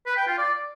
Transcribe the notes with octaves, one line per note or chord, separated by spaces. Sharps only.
B4
G5
F4
D5